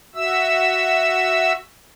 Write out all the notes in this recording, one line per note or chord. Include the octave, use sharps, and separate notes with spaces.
F#4 E5 E6